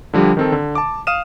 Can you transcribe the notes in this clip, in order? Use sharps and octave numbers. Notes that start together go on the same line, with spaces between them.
D3 F3 G3 D4 G4
D#3 C4 A4
D3
A5 D6
F5 D#6 F6 D#7 E7